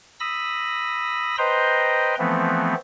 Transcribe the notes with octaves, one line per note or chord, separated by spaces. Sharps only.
B5 D#6 E6 A#6
B4 C5 D#5 G5 A#5 C6
E3 F3 A3 B3 C4